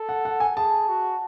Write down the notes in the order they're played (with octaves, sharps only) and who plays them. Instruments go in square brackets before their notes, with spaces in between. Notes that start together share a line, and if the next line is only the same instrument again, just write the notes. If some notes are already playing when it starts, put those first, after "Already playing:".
Already playing: [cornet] A4
[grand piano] F#5
F#5
G#5
[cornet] G#4 [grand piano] A5
[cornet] F#4